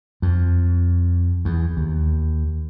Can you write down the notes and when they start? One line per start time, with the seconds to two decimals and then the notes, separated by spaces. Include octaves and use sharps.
0.22 F2
1.45 E2
1.77 D#2